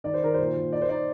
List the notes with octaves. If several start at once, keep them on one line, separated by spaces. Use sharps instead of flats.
D#3 D5
C5
D#3 A#4
A#2 C5
A#2
D#4 D5
C5
D#4 D5